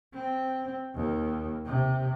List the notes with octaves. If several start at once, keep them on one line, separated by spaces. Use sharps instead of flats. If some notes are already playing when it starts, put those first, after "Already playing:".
C4
D#2
C3